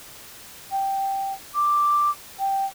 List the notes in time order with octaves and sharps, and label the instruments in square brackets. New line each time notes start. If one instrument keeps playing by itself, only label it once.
[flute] G5
D6
G5